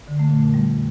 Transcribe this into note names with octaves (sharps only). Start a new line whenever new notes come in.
D3
A3
A#2
F2
G3